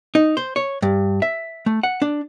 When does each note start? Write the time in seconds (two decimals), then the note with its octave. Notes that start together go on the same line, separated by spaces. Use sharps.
0.15 D#4
0.37 C5
0.56 C#5
0.82 G2
1.22 E5
1.66 A3
1.83 F#5
2.02 D4